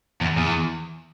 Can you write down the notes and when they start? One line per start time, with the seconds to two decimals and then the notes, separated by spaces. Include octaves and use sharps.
0.21 E2
0.37 E2